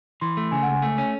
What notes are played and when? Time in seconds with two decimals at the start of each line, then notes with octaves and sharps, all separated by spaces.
0.21 E3 C6
0.37 A3
0.52 C#3 G#5
0.62 F#5
0.68 C#2
0.73 G#5
0.82 A3
0.98 C#4